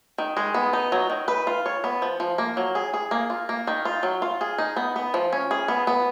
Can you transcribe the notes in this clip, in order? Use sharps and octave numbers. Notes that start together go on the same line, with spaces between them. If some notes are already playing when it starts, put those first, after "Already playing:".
D#3
G#3
B3
D#4
F#3
D#3
B4
F4
C#5
B3
F3
F3
A#3
F#3
G#4
G#4
A#3
F4
A#3
D#3
F4
F#3
F4
G#4
D#4
B3
B3
F3
C#4
G#4
B3
B3